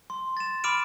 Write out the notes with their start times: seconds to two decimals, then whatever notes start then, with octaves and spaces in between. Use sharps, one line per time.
0.10 C6
0.37 A6 E7
0.64 B5 D6 F6 D7 E7